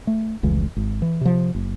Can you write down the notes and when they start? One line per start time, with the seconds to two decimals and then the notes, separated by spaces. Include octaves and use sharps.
0.07 A3
0.43 F1 C#2 C#3 E3
0.76 G#1
1.02 E3
1.21 C3 F3
1.54 F#1